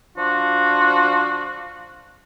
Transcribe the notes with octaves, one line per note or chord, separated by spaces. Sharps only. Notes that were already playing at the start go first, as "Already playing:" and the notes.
F3 D4 F4 F#4